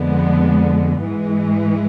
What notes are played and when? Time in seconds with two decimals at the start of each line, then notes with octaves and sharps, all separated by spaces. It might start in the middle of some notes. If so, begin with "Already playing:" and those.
Already playing: F2 D3 G#3 B3
1.01 G#2 E3 G#3